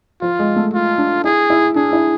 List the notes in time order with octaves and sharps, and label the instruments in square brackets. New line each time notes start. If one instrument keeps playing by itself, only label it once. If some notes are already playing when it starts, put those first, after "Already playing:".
[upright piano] F3 [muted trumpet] F4
[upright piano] G#3
A3
[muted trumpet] F4
[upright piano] D4
[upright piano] E4 [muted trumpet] G#4
[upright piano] E4
[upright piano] D4 [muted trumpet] G#4
[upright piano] E4